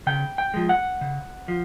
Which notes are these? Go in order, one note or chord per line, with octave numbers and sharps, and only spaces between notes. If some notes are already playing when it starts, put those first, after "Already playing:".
C#3 G5
G5
F3 G#3
F#5
C#3
F3